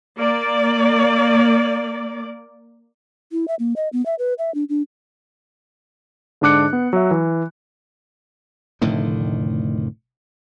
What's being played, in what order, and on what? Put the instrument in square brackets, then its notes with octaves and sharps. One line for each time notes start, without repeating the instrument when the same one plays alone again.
[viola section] A#3 D5
[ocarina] E4
E5
A#3
D#5
B3
E5
B4
E5
D4
D4
[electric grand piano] G#2 D3 D4 D6 F#6 C#7
B3
F#3 E5
E3
[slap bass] F1 A2 D3 D#3